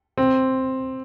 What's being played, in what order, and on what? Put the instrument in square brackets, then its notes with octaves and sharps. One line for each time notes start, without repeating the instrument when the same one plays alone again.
[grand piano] C4